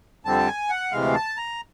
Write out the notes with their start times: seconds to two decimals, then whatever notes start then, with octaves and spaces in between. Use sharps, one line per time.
0.25 F2 D3 G3 C4 A5
0.47 G#5
0.70 F#5
0.92 D2 C3 E3 G#3 F5
1.15 A5
1.37 A#5